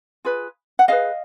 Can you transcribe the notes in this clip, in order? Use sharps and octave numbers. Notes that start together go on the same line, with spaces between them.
F4 G#4 B4
F#5
E4 G#4 B4 D#5 F5